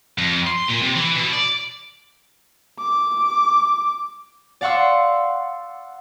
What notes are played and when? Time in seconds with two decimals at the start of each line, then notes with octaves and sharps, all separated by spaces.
0.18 F2
0.47 C6
0.68 A#2
0.82 C3
0.95 E3
1.16 B2
1.33 D5
2.80 D6
4.61 D5 F5 F#5 C6 C#6 E6